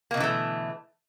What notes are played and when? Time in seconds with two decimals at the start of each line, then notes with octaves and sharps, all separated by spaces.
0.11 A#3
0.14 B2
0.17 D3
0.20 E3
0.24 A3